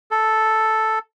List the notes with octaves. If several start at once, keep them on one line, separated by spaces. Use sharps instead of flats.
A4